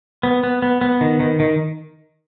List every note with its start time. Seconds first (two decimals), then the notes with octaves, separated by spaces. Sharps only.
0.23 B3
0.43 B3
0.62 B3
0.81 B3
1.01 D#3
1.20 D#3
1.40 D#3